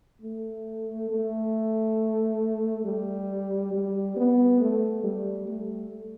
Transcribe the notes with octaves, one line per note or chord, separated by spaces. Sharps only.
A3
A3
G3
G3
B3
A3
G3
A3